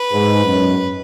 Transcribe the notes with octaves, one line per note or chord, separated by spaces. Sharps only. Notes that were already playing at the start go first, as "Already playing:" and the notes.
Already playing: B4
G#2
F#2 B2